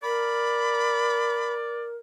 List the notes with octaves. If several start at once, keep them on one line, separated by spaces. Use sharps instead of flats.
A#4 D5 B5